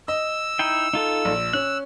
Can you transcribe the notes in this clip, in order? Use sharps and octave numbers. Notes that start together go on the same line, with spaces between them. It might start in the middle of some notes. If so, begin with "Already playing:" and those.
D#5 E6
D#4 E4 G5
D#4 F4 A4
A#1
C#4 F#6